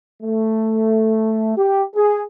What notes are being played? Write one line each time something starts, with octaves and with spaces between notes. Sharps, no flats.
A3
G4
G#4